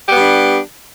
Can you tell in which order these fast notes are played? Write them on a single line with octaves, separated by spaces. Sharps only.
G4 B3 G3 D4